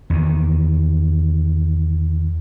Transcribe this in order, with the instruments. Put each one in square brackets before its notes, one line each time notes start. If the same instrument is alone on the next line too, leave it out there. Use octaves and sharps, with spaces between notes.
[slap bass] E2 D#3